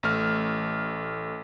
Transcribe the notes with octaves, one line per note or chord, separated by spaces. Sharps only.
A1 A3 F6